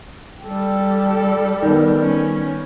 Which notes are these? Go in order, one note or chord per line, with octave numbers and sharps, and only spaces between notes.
G3 G4 A4
D#3 B3
C#4